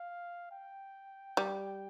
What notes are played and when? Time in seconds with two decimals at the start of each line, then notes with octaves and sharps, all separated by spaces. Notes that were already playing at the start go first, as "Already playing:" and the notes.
Already playing: F5
0.52 G5
1.37 G3